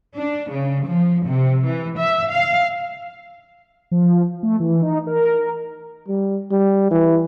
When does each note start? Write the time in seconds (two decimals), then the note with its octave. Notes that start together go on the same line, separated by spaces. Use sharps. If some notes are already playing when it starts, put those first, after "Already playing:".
0.15 D4
0.49 C#3
0.84 F3
1.26 C3
1.65 E3
1.98 E5
2.30 F5
3.91 F3
4.43 A3
4.60 E3
4.82 D#4
5.07 A#4
6.08 G3
6.52 G3
6.91 E3